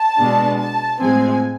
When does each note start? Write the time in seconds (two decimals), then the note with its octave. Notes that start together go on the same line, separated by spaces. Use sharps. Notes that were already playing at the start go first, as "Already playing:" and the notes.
Already playing: A5
0.18 B2 G#3 B3 D4
0.59 A5
1.00 A2 F3 G#3 C4 G#5